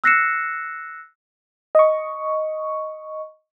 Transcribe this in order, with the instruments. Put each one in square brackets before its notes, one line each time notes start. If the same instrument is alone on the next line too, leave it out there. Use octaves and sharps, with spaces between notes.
[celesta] E6 F#6 A#6 C7 C#7 E7
[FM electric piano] D#5 C#6